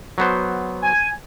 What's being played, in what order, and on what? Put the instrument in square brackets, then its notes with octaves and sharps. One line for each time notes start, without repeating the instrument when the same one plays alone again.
[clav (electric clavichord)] F#3 B3 C5
[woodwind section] G#5